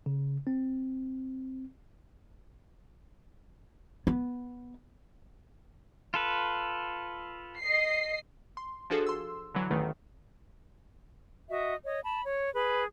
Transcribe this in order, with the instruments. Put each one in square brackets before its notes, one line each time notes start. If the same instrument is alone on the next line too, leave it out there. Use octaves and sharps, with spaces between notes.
[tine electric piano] C#3
C4
[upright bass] B3
[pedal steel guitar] F4 A4 B4
[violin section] D#5 C7
[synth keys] C6
F3 D4 F#4 G#4 A4
C6 E6
D3 E3 F#3
A1 E2 D#3 A3
[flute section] F#4 D#5 E5
C#5 D#5
A5 B5
C#5
G#4 B4